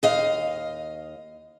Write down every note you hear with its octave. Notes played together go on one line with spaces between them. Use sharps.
D#2 D#5 F5